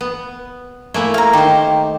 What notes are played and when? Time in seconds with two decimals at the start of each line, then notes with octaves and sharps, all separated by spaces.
0.01 B3
0.94 A3 A#3 E4 G#5
1.14 F5 A#5
1.33 D#3 G4 C5